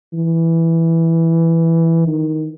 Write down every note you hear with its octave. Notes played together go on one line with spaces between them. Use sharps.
E3
D#3